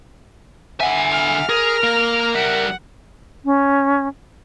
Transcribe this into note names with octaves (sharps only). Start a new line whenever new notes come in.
D3 E5 F#5 G#5
F6
G#4 A#4
A#3
G3 E5 F#5
C#4